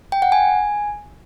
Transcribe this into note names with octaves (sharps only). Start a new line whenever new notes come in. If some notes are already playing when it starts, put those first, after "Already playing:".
G5
F#5
G#5